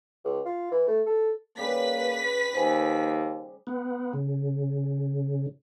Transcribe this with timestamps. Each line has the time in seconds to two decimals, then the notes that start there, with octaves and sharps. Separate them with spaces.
0.25 C#2
0.45 F4
0.71 E3
0.88 A3
1.06 A4
1.57 C#3 G3 A#3 G#4 B4 B6
2.55 D#2 C5 G#5
3.67 B3
4.14 C#3